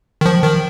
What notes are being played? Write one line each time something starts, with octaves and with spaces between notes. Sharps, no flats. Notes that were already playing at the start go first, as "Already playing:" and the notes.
D#3
F3
D#3